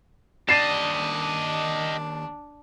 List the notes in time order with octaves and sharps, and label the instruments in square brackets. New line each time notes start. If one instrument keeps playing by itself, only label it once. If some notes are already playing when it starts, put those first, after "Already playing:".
[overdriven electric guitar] D#2 D5 [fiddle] D4 [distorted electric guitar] G4 D#5 [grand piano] A6 C7 E7